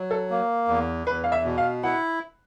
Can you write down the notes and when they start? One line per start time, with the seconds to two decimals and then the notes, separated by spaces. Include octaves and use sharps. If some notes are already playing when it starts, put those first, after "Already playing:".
Already playing: F#3
0.11 A4
0.31 A#3
0.68 E2
1.07 E2 B4
1.24 F5
1.32 E5
1.45 B2
1.58 F5
1.83 E4 F#5